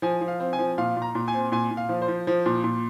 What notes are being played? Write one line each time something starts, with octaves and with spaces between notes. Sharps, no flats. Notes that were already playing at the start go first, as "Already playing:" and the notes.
F3 G#5
F3
F5
C4
G#5
F3
A#2 F5
A#2
A#5
A#2
G#5
C4
A#2 G#5
A#2
F5
F3
C5
F3
F3
A#2
A#2